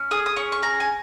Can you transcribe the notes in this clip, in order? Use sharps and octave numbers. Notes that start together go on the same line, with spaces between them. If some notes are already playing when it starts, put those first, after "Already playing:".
Already playing: C#4
G#4 D#6
D#6
C#4 C#6
C#6
G#4 A#5
G#5